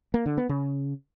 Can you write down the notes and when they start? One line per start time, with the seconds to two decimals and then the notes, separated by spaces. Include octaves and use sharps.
0.14 A#3
0.26 D3
0.38 B3
0.49 C#3